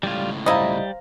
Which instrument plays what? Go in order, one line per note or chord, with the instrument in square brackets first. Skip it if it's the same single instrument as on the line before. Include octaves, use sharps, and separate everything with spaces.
[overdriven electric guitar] C#2 A2 [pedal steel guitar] G3 F4
[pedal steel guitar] G3 [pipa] E4 D#5 [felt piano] C5 F5 A#5